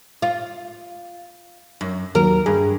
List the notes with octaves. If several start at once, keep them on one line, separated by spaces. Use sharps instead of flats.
F4
F#2
D#2 F#3 A#4
G2 G#4